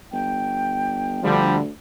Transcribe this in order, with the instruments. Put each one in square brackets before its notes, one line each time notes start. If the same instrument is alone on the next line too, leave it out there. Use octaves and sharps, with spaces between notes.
[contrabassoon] G1 [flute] G5
[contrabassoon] D2 [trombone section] D3 F3 G3